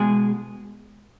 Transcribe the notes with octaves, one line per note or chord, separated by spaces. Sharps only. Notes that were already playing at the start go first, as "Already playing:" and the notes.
Already playing: B2 G#3 G#4